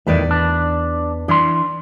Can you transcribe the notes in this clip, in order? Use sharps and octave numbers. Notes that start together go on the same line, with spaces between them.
E2 A2 D#3 B4 D5
D4
E3 D4 C6